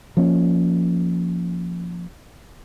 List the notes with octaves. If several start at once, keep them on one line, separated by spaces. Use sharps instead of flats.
F3 A#3 C#4